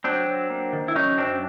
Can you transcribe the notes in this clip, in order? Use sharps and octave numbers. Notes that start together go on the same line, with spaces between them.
F#3 C4 D4
F#3
A#3
D#3
E4
F#3 C#4 D#4
F#2 C4 D4